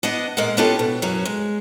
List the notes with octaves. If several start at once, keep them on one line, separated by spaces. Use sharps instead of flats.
B3 D4 D#5 F#5
A#2 G#3 A#4 F5 F#5
B3 C#4 D4 F4 G4 A4
B2
F#2 F#3 C#4
G#3